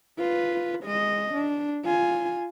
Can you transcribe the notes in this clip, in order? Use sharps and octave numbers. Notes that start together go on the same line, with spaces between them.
F4 B4
G#3 D#5
D4
F4 G#5